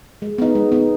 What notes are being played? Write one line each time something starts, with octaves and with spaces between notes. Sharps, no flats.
G#3
B3 D#4
G#3
B3 D#4